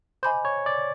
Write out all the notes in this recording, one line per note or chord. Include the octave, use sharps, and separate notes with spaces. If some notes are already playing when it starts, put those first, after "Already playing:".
C5 D#5 G#5 B5 D6 G6
C#5
D5